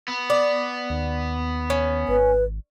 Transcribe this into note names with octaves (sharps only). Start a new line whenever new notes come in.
B3
D5
D#2
C#4
G#1 B4